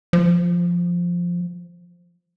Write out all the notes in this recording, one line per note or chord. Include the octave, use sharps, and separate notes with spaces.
F3